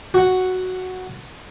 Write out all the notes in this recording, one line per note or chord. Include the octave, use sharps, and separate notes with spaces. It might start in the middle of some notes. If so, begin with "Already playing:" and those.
F#4 F#5